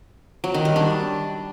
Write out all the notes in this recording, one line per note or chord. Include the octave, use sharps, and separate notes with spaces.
F#3
D#3
G3
D4